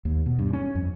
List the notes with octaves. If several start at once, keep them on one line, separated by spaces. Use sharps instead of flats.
D#2
B2
G2
C#4
F2